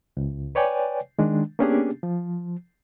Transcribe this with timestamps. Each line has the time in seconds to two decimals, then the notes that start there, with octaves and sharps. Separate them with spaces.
0.17 C#2
0.55 B4 C#5 D5 G5 G#5
1.19 D#3 G#3 D4
1.59 A#3 B3 C#4 D4 G4 G#4
2.03 F3